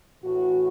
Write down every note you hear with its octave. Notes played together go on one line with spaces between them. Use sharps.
A2 E3 F#4